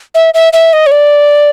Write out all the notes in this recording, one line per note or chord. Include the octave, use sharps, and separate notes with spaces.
E5
E5
E5
D#5
C#5
D5